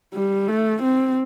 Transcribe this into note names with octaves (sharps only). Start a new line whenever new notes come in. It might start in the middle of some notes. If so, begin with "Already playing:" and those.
G3
A3
C4